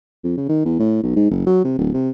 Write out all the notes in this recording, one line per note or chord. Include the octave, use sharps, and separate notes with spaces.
F2
C#3
D#3
E2
A2
B1
G#2
F#1
F#3
C3
D1
C3